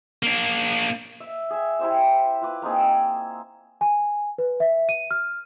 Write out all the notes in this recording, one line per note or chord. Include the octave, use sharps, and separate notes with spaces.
A#3 D4
E5
G#4 E5
E4 G4 C5 E5
F4 B4 D6
A#3 C4 D#4 G#4
E6
G#5
B4
E5
D#7
F6